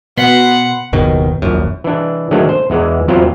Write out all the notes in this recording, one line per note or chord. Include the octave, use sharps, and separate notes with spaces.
B2 F#5 B5 C6
F#1 D#2 B2 D#3
D#1 A#1 F#2
E3 D4
D#3 F#3 G#3 A3 C#4 D4
C5
E2 E3 G#3
E2 F#3 C4 E4 F4 A#5